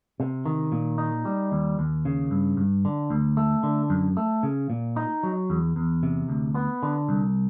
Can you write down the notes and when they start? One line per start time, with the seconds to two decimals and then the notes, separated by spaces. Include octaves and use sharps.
0.20 C3
0.45 D#3
0.72 A#2
0.98 D#4
1.25 G3
1.52 D#2
1.79 D#2
2.05 C#3
2.31 G2
2.57 G2
2.85 D3
3.10 D2
3.37 A3
3.63 D3
3.90 F#2
4.17 A3
4.43 C#3
4.70 A#2
4.97 D#4
5.23 F#3
5.50 E2
5.76 E2
6.03 C3
6.29 D2
6.55 B3
6.83 D3
7.09 C2